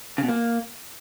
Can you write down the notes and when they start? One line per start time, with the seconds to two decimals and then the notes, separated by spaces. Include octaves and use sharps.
0.18 C#3
0.23 B2
0.29 A#3